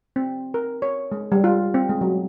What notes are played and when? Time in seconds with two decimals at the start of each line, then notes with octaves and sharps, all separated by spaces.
0.16 C4
0.54 A#4
0.82 C#5
1.12 G#3
1.32 G3
1.44 F4
1.74 C4
1.89 G#3
2.01 F#3